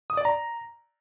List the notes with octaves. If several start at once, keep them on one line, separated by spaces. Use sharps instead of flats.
D#6
D5
A#5